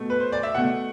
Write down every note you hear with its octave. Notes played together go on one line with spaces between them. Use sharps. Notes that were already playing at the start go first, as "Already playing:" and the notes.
Already playing: B2 A3
B4
C5
D5
E5
B2 A3 F#5